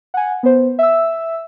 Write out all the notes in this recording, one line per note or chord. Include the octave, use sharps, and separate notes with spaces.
F#5 G#5
B3 C5
E5 E6